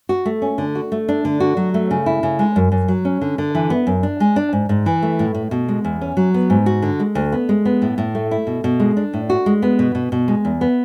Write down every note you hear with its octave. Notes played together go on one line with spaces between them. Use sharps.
F#4
A3
C#4
D3
F#4
A3
D4
D3
F#4
F#3
A3
C#3
E4
C#3
G#3
F#2
F#2
F#3
C#4
D3
D3
E3
B3
F#2
D4
G#3
D4
G#2
G#2
E3
A3
A2
A2
B2
G#3
E2
C#4
F#3
B3
G#2
F#4
D3
G#3
D2
B3
G#3
B3
A2
A2
A3
E4
B2
B2
G#3
D4
A2
F#4
G#3
B3
B2
B2
B2
G#3
E2
B3